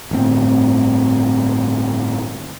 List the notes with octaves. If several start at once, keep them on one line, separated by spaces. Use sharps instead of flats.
G1 A2 C4